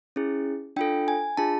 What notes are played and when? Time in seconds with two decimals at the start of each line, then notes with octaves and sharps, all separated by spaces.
0.16 C#4 E4 G#4
0.76 D4 F4 A4 G5
1.08 G#5
1.37 D4 F4 G#4 A5